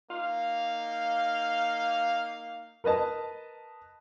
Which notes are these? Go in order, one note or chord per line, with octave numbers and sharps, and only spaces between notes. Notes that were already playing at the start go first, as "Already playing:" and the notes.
A#3 D#4 F5
A#4 B4 D#5 A5